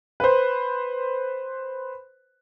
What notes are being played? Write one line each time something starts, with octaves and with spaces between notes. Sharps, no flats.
B4 C5